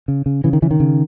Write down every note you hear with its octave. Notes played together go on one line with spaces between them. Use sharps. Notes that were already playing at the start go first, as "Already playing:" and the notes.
C#3
C#3
C#3 E3
D#3
C#3 E3
D#3
C#3